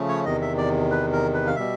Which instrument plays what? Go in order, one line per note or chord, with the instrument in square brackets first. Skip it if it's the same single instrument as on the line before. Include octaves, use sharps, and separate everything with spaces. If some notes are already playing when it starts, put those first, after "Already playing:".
Already playing: [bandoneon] C#3 F3 A3 C#4
C#5
E2 C3 D#3 D#5
E5
D5
B4
A#4
B4
F5
B2 G3 E5